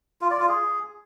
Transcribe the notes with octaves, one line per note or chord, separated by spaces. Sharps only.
F4
D5
F4
G#4